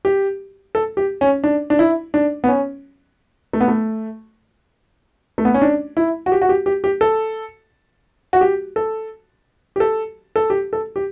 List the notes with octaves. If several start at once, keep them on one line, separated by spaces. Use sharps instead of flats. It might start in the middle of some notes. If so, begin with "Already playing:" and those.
G4
A4
G4
C#4
D4
D4
E4
D4
B3
C#4
A3
B3
A3
A3
B3
C#4
D4
E4
F#4
G4
F#4
G4
G4
G4
A4
F#4
G4
A4
G4
A4
A4
G4
A4
G4